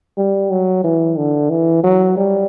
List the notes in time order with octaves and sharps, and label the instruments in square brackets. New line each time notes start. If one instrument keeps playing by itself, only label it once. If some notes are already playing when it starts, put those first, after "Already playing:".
[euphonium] G3
F#3
E3
D3
E3
F#3
G3